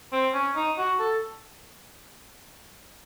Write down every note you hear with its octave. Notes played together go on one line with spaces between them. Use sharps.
C4
C#4
D#4
F#4
A4